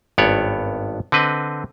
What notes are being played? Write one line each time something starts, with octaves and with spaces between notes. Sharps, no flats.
G#1 G2 B3 C#5 D5
D3 C4 B4 D#5